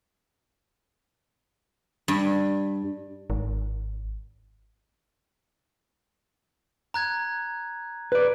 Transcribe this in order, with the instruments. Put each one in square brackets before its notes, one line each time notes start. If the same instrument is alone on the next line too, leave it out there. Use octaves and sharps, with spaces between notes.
[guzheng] G2
[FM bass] G#1
[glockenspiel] A#5 F#6 G#6
[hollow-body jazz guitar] B4 D5